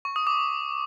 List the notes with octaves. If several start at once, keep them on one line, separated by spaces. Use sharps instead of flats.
C#6
D#6
D6